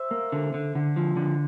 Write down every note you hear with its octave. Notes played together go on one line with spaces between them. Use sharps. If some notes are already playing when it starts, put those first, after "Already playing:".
Already playing: C5 E5
A#3
D3
D3
D3
F3
D3